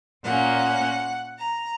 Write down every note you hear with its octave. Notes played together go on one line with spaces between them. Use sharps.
A#2 A#3 C#4 F#5
A#5